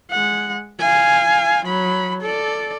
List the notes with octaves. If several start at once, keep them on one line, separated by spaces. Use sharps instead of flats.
G#3 F#5
F5 G#5
F#3 B5
A4 D5